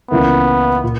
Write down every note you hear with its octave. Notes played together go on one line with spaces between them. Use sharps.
C#2 C#3 E3 A#3 B3 E4
A#2